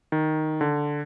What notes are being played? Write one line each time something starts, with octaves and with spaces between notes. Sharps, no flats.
D#3
D3